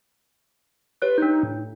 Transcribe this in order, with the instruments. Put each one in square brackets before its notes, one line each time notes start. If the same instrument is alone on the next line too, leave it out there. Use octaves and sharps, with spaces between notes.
[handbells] G4 C#5 F#6 [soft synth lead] B4
[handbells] D4 G6 [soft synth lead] D#4
[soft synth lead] A2